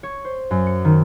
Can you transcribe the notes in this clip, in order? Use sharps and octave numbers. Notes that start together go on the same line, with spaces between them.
C#5
C5
F#2
C#7
D#3